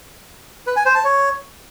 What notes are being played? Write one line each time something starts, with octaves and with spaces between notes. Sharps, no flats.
B4
G#5
C5
A5
C#5